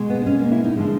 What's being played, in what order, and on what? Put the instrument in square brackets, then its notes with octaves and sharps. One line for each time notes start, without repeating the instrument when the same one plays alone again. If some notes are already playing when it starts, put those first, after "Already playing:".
Already playing: [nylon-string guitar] B2 G#3
B3
D4
C#4
A#3
E4
D#4
D3 F3 G#3